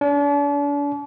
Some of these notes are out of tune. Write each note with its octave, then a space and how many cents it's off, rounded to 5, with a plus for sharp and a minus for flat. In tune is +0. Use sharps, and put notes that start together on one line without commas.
D4 -40